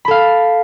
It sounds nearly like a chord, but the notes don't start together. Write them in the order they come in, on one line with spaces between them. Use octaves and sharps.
B5 A4 F5